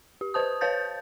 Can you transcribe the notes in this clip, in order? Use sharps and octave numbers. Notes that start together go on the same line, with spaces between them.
G4
B4 C5 A5 D#6
B4 C#5 F5 A5 G6 A6